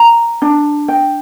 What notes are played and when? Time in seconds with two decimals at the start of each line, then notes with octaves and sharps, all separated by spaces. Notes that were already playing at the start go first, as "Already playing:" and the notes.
Already playing: A#5
0.42 D4
0.88 G5